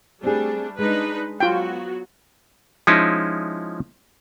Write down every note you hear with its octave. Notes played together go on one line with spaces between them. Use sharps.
G3 A3 C4 D4 G4 G#4
G#3 D4 D#4 B4
F#3 B3 F4 F#4 G5
F3 G#3 C#4 D#4 E4